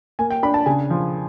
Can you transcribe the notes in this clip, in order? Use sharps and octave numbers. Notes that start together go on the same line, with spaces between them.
A#3 G#5
G5
D4 B5
A5
C#3 G#5
F3